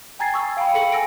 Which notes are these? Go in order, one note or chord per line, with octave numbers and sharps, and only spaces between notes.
G5 G#5 A#5 G#6 A6 C7
C#6 D#6 E6
F5 G5 A#5 B5
G#4 A4 C#7 F#7
F#5 G#5 E6 A#6 D7